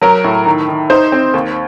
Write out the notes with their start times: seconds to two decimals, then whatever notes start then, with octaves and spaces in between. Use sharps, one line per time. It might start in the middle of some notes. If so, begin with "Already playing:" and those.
0.01 F#3 A#4
0.24 A2
0.46 D#3
0.68 D#3
0.90 D#4 C5
1.12 C4
1.34 D#2